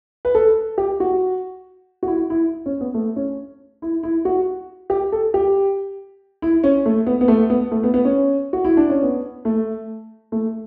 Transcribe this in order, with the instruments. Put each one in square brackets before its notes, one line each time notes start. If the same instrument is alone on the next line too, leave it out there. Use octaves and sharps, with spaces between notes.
[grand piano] B4
A4
G4
F#4
F#4
E4
E4
C#4
B3
A3
C#4
E4
E4
F#4
G4
A4
G4
E4
C#4
A3
B3
B3
A3
B3
A3
B3
B3
C#4
F#4
E4
D4
C#4
B3
A3
A3